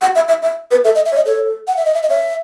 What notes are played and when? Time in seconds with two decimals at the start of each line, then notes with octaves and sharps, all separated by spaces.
0.02 F#5
0.15 E5
0.28 E5
0.42 E5
0.71 B4
0.84 A4 E5
0.95 D#5
1.06 E5
1.12 C#5
1.16 D#5
1.26 A4 C#5
1.68 F#5
1.77 E5
1.85 D#5
1.94 E5
2.03 D#5
2.09 C#5 E5